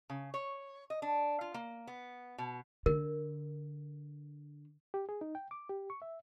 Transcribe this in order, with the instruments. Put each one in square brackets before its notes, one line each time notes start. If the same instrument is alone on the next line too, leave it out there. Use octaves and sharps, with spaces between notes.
[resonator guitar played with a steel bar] C#3
C#5
D#5
D4
F4
A#3
B3
B2
[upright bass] D3 [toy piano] A#4
[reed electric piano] G4
G#4
D#4
G5
D6
G4
C#6
E5